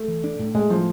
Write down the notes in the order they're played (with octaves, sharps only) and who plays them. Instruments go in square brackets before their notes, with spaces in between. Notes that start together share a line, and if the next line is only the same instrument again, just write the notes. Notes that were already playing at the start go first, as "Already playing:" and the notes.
Already playing: [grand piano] A3
[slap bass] E3
D4
A2
[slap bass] A2 [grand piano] G#3
[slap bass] A2 [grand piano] F3